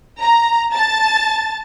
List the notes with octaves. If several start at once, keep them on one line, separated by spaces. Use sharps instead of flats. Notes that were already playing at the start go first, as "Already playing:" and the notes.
A#5
A5 A6